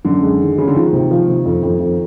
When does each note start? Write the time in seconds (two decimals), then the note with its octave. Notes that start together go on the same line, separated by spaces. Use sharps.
0.05 F#2 D3
0.22 G#3
0.40 D#3
0.57 C#3 G#3
0.67 D3
0.75 D#3 F3
0.93 C3
1.11 F3
1.28 C3
1.46 F2
1.63 F2
1.80 F2